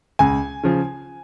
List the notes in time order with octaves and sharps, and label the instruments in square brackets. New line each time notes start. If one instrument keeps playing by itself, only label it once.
[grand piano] C#2 G#5
C#3 F3